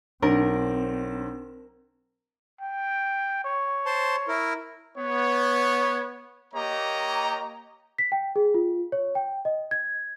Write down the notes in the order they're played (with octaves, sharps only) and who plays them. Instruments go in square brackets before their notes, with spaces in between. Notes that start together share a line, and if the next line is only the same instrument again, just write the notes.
[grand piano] B1 [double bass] C4 [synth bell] D4 [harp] A#4
[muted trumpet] G5
C#5
[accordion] C5 A5 C6
E4 A#4
[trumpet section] B3 C#5
A#3 G4 C#5 D#5 A#5
[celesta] B6
G5
G#4
F4
C#5
G5
D#5
G#6